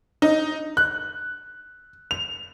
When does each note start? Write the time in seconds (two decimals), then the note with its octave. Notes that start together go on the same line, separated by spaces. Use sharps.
0.22 D#4
0.77 F#6
2.11 F7